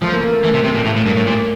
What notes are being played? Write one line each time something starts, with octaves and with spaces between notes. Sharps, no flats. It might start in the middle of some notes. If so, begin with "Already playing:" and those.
F3 A3
A#3
A#3
A3
E3 A3
C3 A3
C3 A3
A#2 A3
A2 A#3
A2
G2
A2
A#2